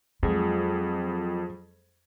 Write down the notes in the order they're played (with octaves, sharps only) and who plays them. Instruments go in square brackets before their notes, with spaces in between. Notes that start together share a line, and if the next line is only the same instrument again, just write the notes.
[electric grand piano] F2 [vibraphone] F#3 F4 D#6 [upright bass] G#3 [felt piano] G#4